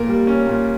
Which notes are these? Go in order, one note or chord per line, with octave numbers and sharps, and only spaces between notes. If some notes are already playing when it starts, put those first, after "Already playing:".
Already playing: A#2 A#3 A#4
G3
C#4
A#2